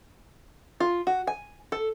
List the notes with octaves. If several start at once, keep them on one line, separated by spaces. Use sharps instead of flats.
F4
F#4
G#5
A4